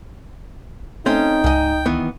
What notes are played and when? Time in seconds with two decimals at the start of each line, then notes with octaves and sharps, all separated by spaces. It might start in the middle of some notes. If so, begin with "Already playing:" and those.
1.06 A3 C4 C#4 D#4 G5
1.44 C#2 G#2 D#5
1.86 D#3 E3 B3